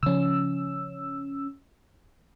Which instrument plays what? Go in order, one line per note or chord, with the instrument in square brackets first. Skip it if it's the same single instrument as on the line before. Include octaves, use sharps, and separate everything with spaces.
[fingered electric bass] C#3 F3 [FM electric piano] C#4 E6